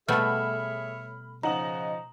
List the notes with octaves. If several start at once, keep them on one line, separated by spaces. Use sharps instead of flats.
B2 G3 A3 G#4 C#5 E5 B5 F6
C#3 F3 D#4 F#5 A#5 D#6 F#7